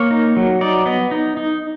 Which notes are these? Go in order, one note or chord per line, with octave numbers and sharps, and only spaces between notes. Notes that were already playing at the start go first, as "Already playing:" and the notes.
Already playing: A#3 C#5
D#4
F#3
D#4 D5
B3 D#5
D#4
D#4